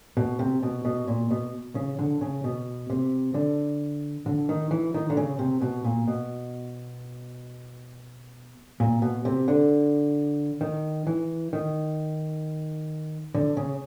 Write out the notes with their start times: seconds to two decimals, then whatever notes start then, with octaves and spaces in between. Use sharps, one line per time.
0.17 B2
0.39 C3
0.63 B2
0.85 B2
1.08 A#2
1.31 B2
1.75 C#3
1.99 D3
2.21 C#3
2.44 B2
2.90 C3
3.34 D3
4.26 D3
4.49 D#3
4.71 E3
4.94 D#3
5.10 D3
5.17 C#3
5.39 C3
5.61 B2
5.84 A#2
6.08 B2
8.80 A#2
9.02 B2
9.25 C3
9.48 D3
10.61 D#3
11.07 E3
11.53 D#3
13.35 D3
13.57 C#3